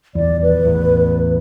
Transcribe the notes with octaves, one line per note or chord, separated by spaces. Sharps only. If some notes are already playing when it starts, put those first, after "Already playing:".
D#1 E2 D5
B4
A1 E2